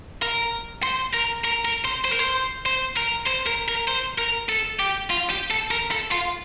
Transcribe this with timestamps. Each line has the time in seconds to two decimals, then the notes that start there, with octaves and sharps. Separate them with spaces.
0.22 A#4
0.83 C5
1.13 A#4
1.44 A#4
1.65 A#4
1.85 C5
2.05 C5
2.12 A#4
2.19 C5
2.66 C5
2.97 A#4
3.27 C5
3.47 A#4
3.68 A#4
3.88 C5
4.18 A#4
4.49 A4
4.80 G4
5.10 F4
5.30 G4
5.51 A4
5.71 A#4
5.91 A4
6.12 F4